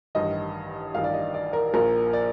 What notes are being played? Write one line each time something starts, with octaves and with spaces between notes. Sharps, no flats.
A1 G2 D#3 D#5
A1 G2 D#3 F5
D5
D#5
D5
A#4
A#1 A#2 F3 A#4
D5